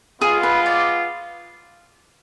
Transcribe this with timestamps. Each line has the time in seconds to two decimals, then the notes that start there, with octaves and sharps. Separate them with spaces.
0.21 G#3 B3 F4 G#4
0.43 B4
0.66 D5